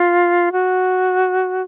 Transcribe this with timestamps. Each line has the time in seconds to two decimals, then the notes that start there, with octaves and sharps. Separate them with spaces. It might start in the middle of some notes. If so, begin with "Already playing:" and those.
Already playing: F4
0.52 F#4